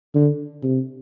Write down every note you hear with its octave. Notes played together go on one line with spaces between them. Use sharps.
D3
C3